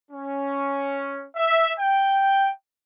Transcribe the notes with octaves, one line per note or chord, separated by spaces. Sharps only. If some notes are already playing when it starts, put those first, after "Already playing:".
C#4
E5
G5